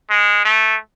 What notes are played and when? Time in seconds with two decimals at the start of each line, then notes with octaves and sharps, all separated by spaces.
0.10 G#3
0.45 A3